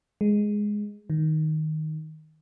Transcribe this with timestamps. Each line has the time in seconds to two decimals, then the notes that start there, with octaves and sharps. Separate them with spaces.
0.21 G#3
1.10 D#3